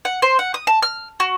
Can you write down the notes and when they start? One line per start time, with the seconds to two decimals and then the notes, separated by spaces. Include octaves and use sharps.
0.05 F#5
0.22 C5
0.39 F#5
0.54 D#6
0.67 A5
0.82 F6
1.20 F#4